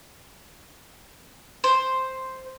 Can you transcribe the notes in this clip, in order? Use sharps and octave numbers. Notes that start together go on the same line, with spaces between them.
C5